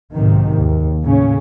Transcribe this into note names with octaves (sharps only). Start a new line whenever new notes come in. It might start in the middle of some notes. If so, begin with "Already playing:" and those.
B1 G#2 C3 D#3
D#2
A2 C#3 C#4